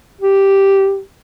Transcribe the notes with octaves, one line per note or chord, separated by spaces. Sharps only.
G4